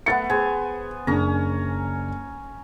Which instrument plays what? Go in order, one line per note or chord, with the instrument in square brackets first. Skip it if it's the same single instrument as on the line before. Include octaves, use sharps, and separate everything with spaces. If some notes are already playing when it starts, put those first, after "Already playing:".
[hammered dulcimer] A3 B3 [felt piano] F#5 A6 C#7
[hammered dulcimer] B3 C5 G#5 [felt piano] G#4
[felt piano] F#1 D4 [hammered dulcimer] C#4 A#5